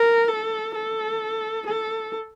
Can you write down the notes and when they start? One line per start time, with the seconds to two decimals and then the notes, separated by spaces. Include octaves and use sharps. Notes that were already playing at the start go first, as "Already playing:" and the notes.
Already playing: A#4
0.29 A4
0.75 A4
1.67 A4